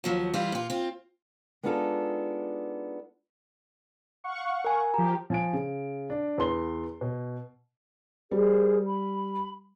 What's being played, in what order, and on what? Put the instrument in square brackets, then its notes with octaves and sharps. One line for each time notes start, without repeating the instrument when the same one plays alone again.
[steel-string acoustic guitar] D#2 F3 F#3
E3 G3 F4
A#2 F4
C4 F4
G#3 B3 D4 D#4 F4 A4
[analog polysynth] F5 F#5 C#6
[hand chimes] A#4 G#5
[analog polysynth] F3 G4 [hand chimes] A#5
[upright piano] F3 G#5 D7
C#3
D4
E2 B3 C6 G7
B2
[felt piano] G3 [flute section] G#4 A#4 C5
[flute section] B5